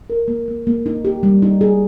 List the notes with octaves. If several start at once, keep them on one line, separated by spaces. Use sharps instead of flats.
A#4
A#3
A#3
A#3
D#4
G4
G3
D#4
G#4